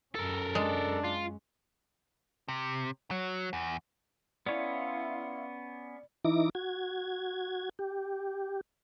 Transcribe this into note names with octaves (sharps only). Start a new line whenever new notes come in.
F#2 C#4 A4 A#4
G#3 D4
F4
C3
F#3
E2
B3 C#4 E4 C#5 D5 F5 C6
E3 D#4 E4 D6 A#6
F#4 G#6
G4